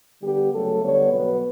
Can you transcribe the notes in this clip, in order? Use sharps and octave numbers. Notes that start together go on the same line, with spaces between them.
D3 G3 B3 G4
C#3 F#3 A3 A4
D3 G3 B3 C#5
B2 F#3 B3 B4